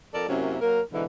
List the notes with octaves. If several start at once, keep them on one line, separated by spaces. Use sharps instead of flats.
F2 A4 A#4 D5
F#2 C3 A#3 C#4 E4
F#3 A#3 A#4
G#2 B2 D3 E3